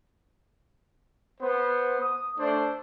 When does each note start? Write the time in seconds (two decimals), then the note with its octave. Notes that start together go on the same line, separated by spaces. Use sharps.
1.40 B3 C5
2.00 D#6
2.38 A3 D4 C5